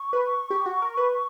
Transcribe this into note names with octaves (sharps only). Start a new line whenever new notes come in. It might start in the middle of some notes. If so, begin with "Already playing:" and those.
Already playing: C#6
B4
G4
F#4
A#4
B4